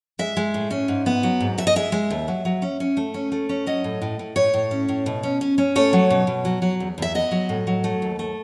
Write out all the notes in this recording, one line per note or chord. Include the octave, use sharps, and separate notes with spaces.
G#3 E5
G#3
A2
C#4
G#2
B3
F#3
G#2
D#2 E5
D#5
G#3 E5
G#3
D#2
F#3
F#3
C#4
C#4
A3
C#4
A3
C#4
F#3 D#5
A2
A2
A2
A2 C#5
A2
C#4
A2
B2
C#4
C#4
C#4
A3 C#5
F#3
B2
B2
F#3
F#3
E2
E2 E5
B3 D#5
F#3
A2
F#3
A3
D#2
A3